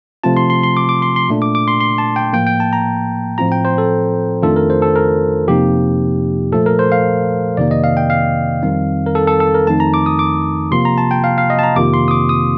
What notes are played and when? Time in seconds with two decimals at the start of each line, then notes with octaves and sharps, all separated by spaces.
0.24 C3 F3 A3 C4 F4 A5
0.37 C6
0.50 C6
0.63 C6
0.77 D6
0.89 D6
1.02 C6
1.16 C6
1.29 A#2 A3 D4
1.42 D6
1.55 D6
1.68 C6
1.80 C6
1.98 A5
2.16 G5
2.33 A2 F3 A#3 G5
2.47 G5
2.60 A5
2.73 A#5
3.38 A2 F3 C4 F4 A#5
3.52 G5
3.65 C5
3.78 A4
4.42 F2 D#3 A3 D4 F4 A4
4.56 A#4
4.70 C5
4.82 A4
4.96 A#4
5.48 F2 C3 F3 A#3 D#4 G4
6.52 A#2 F3 A3 A4
6.66 A#4
6.79 C5
6.92 F5
7.57 F2 C3 D#3 A#3 D5
7.71 D#5
7.84 F5
7.97 G5
8.10 F5
8.63 F2 D#3 G3 C4 D#4
9.06 A#4
9.15 A4
9.27 A4
9.40 A4
9.54 A#4
9.67 F2 D#3 A3 D#4 A5
9.80 A#5
9.94 D6
10.06 D#6
10.19 D6
10.71 C3 F3 A#3 F4 C6
10.85 A#5
10.98 A5
11.11 G5
11.24 F5
11.38 F5
11.50 D#5
11.59 A5
11.63 A#5
11.76 F2 C3 D#3 A#3 F4 D6
11.94 C6
12.08 D#6
12.11 D6
12.29 D#6